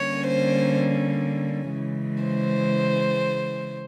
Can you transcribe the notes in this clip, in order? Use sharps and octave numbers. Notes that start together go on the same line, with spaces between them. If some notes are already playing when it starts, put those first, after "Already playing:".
Already playing: D3 G3 A#3 C#4 C#5
C5
C#3 E3 G#3
C5